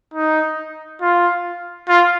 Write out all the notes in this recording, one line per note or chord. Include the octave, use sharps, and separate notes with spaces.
D#4
F4
F4